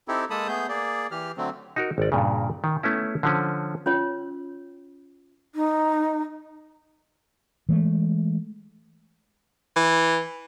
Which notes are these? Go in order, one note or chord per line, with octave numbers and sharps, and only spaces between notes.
C4 D#4 E4 G4 A4
G#3 A#3 A4 A5 B5 D#6
A3 B3 G#4 G6
A#3 G#4 D5
E3 G4 F6
D3 F#3 A3 C4
D#4 F#4 A#4
G#1 D5
G2 A#2 C#3
D#3
A3 B3 C#4 E4
D3 F3 C#4
C#4 F4 C#5
D#4
E3 G#3 A3
E3